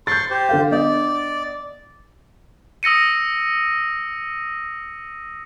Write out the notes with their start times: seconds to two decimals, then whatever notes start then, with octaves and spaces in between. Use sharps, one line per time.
0.07 C6 C#6 G6 A6
0.30 G4 C5
0.49 D3 A4 F5
0.71 B3 D4 D5 D#5
2.83 D#6 E6 A#6 C#7 D#7